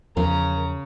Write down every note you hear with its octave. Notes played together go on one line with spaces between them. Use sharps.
E2 C#3 F3 C#4 A#4 A#5